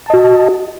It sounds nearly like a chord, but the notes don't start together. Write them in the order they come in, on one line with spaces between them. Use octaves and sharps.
A5 D#5 F#4